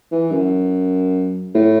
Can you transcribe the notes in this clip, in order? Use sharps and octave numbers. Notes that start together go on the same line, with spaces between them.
E3
F#2
A2